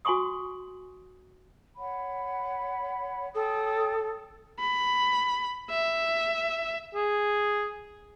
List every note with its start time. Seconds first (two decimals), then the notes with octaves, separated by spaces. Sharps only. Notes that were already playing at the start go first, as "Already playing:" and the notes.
0.05 F#4 G#5 C6 C#6 D#6
1.77 C#5 F#5 B5
3.35 A4 C#5 G5 D#6
4.60 B5
5.70 E5
6.95 G#4